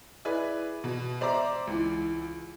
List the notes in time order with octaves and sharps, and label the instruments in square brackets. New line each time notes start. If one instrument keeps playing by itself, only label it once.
[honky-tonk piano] E4 G#4 B4 D5
B2
C5 D5 E5 A#5 C6 D6
C#2 E3